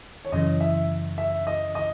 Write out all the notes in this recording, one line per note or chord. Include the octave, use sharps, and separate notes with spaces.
C#5
F#2 C#3 E3 D#5
E5
E5
D#5
D#5